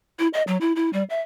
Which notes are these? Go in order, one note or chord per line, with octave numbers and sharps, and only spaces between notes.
E4
D#5
F#3
E4
E4
G3
E5